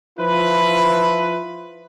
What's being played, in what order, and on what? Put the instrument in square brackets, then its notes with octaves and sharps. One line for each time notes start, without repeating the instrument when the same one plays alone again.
[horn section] F3 E4 F4 B4